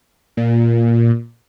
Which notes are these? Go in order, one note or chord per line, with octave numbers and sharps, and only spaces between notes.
A#2